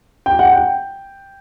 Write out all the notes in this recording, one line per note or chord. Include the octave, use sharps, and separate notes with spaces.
G5
F#5
G5